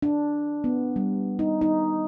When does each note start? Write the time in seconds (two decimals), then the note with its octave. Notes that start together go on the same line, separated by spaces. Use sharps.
0.02 D4
0.64 B3
0.96 G3
1.39 D#4
1.61 D#4